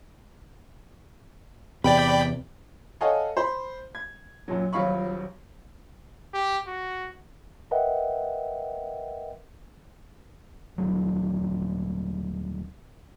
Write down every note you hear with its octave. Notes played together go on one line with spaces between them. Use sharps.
E2 C3 D5 G5 B5
A4 C#5 D#5 F5 F#5 G#5
C5 B5
G#6
F#2 A#2 F#3
D#1 A#1 F#3 F5 B5 C#6
G4
F#4
A#4 B4 D#5 E5 F#5 G5
D#1 B1 F#3